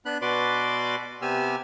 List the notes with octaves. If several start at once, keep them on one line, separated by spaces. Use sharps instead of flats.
B3 D4 B5 F#6
B2 F#4 B4 D5 C6 D6
C3 B3 G4 G#5 E6 F6